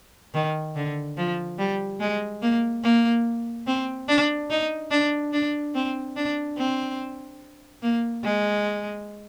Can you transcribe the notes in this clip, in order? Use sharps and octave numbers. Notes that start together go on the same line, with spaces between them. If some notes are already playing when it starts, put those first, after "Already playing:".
D#3
D3
F3
G3
G#3
A#3
A#3
C4
D4
D#4
D4
D4
C4
D4
C4
A#3
G#3